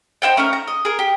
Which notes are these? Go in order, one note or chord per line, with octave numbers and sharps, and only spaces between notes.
D#4 C5 F#5 G5
A3 C#4 D#4 A#4
A#5
D#5
G#4 A#4
G4